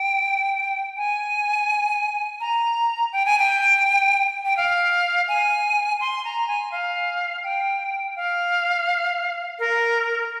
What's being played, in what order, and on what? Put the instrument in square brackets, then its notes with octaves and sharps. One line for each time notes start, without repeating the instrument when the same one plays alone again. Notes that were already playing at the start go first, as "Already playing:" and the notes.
Already playing: [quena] G5
G#5
A#5
G5
G#5
G5
G5
F5
G#5
C6
A#5
G#5
F5
G5
F5
A#4